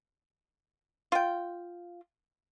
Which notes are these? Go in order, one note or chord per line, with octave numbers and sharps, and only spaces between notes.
F4 G5